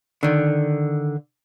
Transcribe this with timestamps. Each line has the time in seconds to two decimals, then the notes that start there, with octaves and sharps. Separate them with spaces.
0.23 D3 D#3